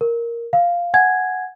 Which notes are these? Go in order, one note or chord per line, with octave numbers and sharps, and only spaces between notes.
A#4
F5
F#5 G#5 G#6